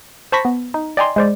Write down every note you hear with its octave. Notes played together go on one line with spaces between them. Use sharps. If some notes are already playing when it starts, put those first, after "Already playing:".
C5 A5 B5 C#6 A#6 B6
B3
D#4
D5 D#5 G5 G#5 A#5 C6
G#3 C5 D5